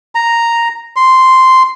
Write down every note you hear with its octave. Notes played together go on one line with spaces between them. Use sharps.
A#5
C6